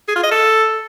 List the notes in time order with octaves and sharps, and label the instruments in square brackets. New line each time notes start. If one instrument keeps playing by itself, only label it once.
[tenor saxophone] G#4
F4
D#5
A4